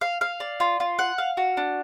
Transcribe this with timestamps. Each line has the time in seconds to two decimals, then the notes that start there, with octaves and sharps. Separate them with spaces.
0.01 F5
0.21 F5
0.40 D5
0.60 F4
0.80 F4
0.99 F#5
1.18 F5
1.37 F#4
1.57 D4